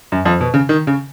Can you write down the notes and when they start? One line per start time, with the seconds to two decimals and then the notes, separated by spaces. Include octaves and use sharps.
0.12 F#2
0.25 F2
0.41 B2
0.54 C#3
0.69 D#3
0.87 C#3